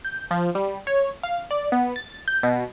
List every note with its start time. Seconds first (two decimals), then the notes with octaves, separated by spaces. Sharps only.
0.05 G6
0.31 F3
0.55 G3
0.87 C#5
1.23 F5
1.51 D5
1.72 B3
1.96 A6
2.28 G6
2.43 B2